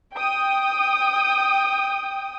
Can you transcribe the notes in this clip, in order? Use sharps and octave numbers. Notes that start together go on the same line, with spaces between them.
G5 D#6